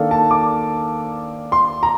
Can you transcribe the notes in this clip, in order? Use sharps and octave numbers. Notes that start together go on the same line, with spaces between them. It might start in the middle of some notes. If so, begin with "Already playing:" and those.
Already playing: D#3 A#3 D4 A4 F5
A5
D6
C6
A#5